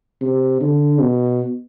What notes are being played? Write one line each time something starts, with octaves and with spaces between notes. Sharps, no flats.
C3
D3
B2